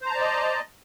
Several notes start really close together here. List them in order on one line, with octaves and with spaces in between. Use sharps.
C5 A#5 A5 D5 D#5